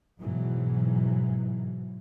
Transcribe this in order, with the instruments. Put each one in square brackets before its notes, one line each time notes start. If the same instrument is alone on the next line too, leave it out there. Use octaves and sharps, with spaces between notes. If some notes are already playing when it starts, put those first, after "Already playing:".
[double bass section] G#2 B2 E3 F#3